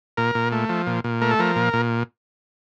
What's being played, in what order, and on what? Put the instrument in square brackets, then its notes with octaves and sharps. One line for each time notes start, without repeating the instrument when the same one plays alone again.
[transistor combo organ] A#2 A#4
A#2
A3
F3
A#2
A#2
A3 A#4
A4
F3 A#4
A#2
A#2